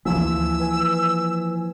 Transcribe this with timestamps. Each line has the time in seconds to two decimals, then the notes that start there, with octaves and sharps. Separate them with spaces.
0.05 D2 E3 F3 A#3 G#5 E6
0.60 B4 G#5